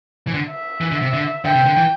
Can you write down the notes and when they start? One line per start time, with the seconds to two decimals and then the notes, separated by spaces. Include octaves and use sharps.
0.27 E3
0.34 D3
0.50 E5
0.81 E3
0.92 D3
1.02 C3
1.13 D3
1.44 D3 G5
1.55 C3
1.66 D3
1.77 E3